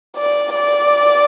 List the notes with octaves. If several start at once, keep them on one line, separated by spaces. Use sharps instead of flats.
D5
D5